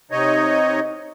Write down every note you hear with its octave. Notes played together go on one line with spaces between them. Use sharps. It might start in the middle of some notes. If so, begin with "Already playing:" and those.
C3 D#4 C#5 D#5